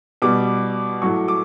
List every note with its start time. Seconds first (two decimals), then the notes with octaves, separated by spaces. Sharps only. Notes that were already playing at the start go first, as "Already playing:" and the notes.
0.22 B2 G3 D6
1.02 A2 F#3 C#6
1.28 D6